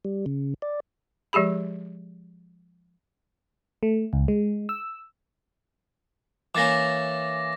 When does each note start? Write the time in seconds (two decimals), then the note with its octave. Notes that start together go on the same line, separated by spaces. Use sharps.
0.05 G3
0.26 C#3
0.62 D5
1.33 F3 G#3 G4 G#4 B5
3.83 A3
4.13 C#2
4.28 G#3
4.69 E6
6.55 E3 A#3 C#4 D6 A6 A#6